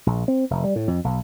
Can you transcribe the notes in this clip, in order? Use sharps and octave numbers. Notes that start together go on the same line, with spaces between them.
A#1
C4
F1
G3
A2
F2
B1